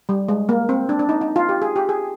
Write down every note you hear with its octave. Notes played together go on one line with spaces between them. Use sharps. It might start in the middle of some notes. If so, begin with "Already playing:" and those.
G3
G#3
A#3
C4
D4
D4
D#4
D#4
F4
G4
G#4
G4
G#4